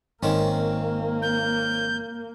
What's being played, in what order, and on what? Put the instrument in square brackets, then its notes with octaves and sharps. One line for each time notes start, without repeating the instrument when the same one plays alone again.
[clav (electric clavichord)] G#1 [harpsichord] D#3 C4 C#4 [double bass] A#3
[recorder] G6